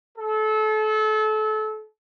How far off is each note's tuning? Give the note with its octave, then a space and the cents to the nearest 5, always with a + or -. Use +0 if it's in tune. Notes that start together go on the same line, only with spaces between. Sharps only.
A4 -30